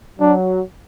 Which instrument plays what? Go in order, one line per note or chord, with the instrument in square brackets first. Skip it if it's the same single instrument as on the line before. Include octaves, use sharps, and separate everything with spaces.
[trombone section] F#3 [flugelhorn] D4